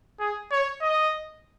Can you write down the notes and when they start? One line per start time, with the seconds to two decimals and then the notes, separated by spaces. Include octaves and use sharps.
0.21 G#4
0.52 C#5
0.82 D#5